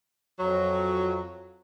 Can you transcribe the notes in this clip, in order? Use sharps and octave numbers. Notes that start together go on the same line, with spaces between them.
F2 F#3